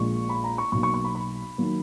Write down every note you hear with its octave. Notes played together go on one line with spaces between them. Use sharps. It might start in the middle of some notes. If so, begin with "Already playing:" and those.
Already playing: A#1 A#2 G#3 C#6
B5
A#5
C#6
B1 B2 A#3 C#6
C#6
C#6
B5
B5
D#3 F#3 A#3